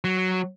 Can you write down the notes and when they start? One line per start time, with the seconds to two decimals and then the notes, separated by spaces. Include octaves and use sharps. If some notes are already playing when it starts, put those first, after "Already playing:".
0.04 F#3